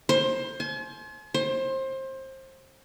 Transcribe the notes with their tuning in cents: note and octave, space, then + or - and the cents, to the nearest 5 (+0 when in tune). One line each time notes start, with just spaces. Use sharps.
C5 +20
G#5 +45
C5 +25